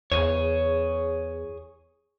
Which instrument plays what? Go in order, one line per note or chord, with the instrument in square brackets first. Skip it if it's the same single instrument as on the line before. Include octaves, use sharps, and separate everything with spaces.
[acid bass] E2 [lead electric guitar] G#4 C#5